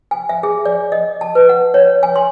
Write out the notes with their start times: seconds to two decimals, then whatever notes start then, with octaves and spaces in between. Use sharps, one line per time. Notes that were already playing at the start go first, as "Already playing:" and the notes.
0.11 G#5
0.29 E5
0.43 G#4
0.65 D5
0.92 D#5
1.21 A5
1.35 B4
1.49 F#5
1.74 C#5
2.03 G#5
2.16 C6